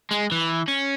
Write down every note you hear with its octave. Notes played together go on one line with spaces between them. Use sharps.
G#3
E3
C#4